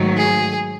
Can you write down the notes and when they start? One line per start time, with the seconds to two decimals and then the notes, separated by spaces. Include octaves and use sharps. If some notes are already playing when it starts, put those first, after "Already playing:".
Already playing: G#2 D#3 F#3 A3
0.17 G#4